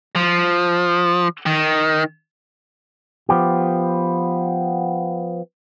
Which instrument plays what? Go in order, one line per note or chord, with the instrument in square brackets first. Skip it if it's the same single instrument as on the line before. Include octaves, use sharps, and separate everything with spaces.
[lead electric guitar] F3
D#3
[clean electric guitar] F3 B3 G4